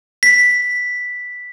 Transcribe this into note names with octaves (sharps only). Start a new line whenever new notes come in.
B6